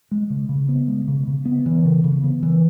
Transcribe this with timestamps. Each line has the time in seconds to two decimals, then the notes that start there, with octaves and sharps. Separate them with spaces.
0.11 G#3
0.30 C#3
0.49 C#3
0.69 B3
0.88 G#3
1.08 C#3
1.27 C#3
1.45 B3
1.66 E3
1.85 C#3
2.04 C#3
2.23 B3
2.43 E3